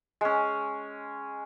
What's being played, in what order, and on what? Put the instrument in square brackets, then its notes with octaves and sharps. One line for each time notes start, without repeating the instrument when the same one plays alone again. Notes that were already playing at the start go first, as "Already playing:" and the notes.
[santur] G#3 C#4